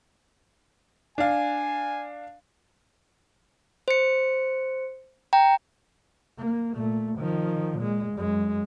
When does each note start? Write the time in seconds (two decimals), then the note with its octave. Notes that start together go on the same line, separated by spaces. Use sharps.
1.18 D4 F5 G#5
3.88 C5 C#7
5.33 G5 A#5
6.38 A#3
6.74 A#2 A3
7.18 D#3 F3
7.78 A#2 G#3
8.14 F#2 G#3